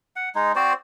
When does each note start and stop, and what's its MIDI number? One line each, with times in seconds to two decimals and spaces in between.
0.16 0.29 78
0.35 0.52 56
0.35 0.52 63
0.55 0.73 60
0.55 0.73 66
0.55 0.73 72
0.55 0.73 74